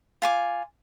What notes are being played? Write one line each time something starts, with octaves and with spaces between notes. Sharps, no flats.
F4 G#5 D6